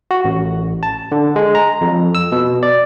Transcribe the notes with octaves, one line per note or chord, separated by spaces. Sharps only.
F#4
A1
A5
D3
G#3
A#5
F2
E6
B2
D5